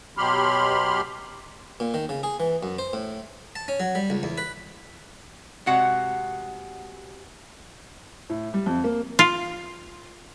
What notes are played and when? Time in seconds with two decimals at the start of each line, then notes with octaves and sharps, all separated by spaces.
0.17 B2 F#3 G4 B5 C6 F6
1.80 A#2
1.94 D#3
2.09 C#3
2.23 G#4
2.40 E3
2.63 F#2
2.79 C5
2.93 A2
3.56 A5
3.68 C#4
3.80 F#3
3.95 G3
4.10 C#2
4.23 E2
4.38 B4
5.66 C3 G#3 F#4 F#5
8.29 A2
8.54 G3
8.66 F2
8.84 A#3
9.19 F4